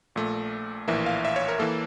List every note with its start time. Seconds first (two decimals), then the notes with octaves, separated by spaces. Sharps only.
0.15 A#1 A#2 A3
0.88 A#1 A2 E3 A#3 E5
1.06 F5
1.25 E5
1.36 C#5
1.48 A#4
1.59 E3 A#3 A4